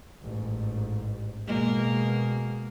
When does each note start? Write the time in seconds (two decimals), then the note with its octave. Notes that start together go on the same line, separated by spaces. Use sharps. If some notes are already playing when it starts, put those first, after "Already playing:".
0.22 A1 G#2
1.47 B2 G#3 A#3